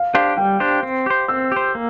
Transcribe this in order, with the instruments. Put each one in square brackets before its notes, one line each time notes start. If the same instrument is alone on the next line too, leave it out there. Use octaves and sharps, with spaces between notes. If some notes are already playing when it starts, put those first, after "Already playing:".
Already playing: [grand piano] F5
[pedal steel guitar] D4 G4 C5 [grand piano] F5
[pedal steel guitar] G3 [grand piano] G5
[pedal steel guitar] D4 G4 C5
C4
G4 C5
[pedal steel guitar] C4 [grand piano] E6
[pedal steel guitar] G4 C5
A#3